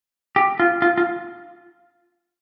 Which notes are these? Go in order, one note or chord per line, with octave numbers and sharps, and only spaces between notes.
G4
F4
F4
F4